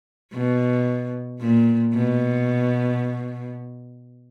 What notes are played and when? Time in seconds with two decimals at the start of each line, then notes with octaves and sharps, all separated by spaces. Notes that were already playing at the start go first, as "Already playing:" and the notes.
0.33 B2
1.41 A#2
1.93 B2